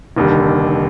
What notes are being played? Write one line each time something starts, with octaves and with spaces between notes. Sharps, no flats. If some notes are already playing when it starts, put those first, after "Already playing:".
F1 D#2 D3 G3